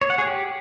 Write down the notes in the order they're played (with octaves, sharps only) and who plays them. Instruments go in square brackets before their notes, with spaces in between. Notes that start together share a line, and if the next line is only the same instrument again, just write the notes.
[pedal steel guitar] C#5
F#5
G#4
G4